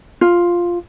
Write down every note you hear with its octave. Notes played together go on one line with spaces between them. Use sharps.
F4